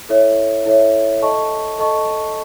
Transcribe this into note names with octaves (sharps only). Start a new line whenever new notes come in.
E4 A4 C#5 E5
E4 A4 C#5 E5
A4 D#5 A5 C#6
A4 D#5 A5 C#6